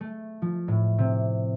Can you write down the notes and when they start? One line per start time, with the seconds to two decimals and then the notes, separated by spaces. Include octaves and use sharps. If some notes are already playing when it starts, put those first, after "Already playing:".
0.01 A3
0.42 F3
0.68 A2
0.99 C3